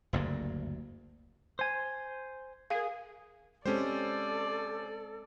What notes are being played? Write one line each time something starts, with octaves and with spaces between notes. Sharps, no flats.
F#1 D2 G2 A#3
C5 G#5
G#4 A#4 F5
G#3 C4 C#4 G4 A4 C5 D5